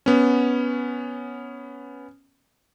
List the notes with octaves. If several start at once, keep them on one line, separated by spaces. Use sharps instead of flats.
B3 C#4